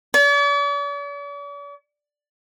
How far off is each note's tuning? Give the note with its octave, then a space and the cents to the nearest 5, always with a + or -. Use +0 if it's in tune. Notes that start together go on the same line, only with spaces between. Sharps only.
D5 -45